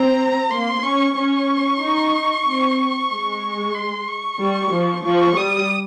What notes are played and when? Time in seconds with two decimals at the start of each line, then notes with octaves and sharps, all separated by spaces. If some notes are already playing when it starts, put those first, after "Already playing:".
Already playing: C4 A#5
0.50 A#3 C6
0.82 C#4 C#6
1.15 C#4 C#6
1.79 D#4
2.45 C4
3.10 G#3
3.74 C6
4.08 C#6
4.39 G3
4.71 F3
5.04 F3 C#6
5.37 G3 D#6